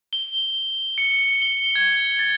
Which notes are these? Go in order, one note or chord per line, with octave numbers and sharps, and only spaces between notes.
G7
C#7
G7
G#6
A6